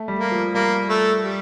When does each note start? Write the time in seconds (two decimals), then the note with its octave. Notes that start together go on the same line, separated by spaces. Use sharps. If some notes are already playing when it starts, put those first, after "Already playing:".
Already playing: A3
0.08 G3
0.19 A#3
0.31 F3
0.54 G3 A#3
0.89 A3
1.24 G3